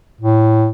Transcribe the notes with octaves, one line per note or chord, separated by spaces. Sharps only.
A2